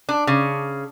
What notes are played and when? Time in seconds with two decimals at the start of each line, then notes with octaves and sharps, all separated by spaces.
0.09 D4
0.27 C#3